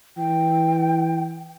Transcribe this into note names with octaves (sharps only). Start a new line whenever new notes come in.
E3 G5